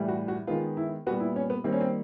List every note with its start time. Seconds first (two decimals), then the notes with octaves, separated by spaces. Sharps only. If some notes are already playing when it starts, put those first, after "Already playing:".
Already playing: A2 E3 G3
0.08 F#4
0.28 F#4
0.47 D#3 G#3 B3 F4
0.77 E4
1.07 A#2 G3 B3 F#4
1.20 E4
1.36 C#4
1.50 B3
1.64 D#3 G3 A#3 C4
1.73 C#4
1.81 C4